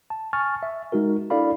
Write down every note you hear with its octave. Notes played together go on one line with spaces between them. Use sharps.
A5
G#5 C#6 F6 A6
E5
G#3 D#4 F#4 A#4
D4 E4 A4 D5 F5 B5